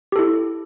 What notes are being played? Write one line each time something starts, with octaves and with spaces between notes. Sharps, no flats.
E4 G4 A4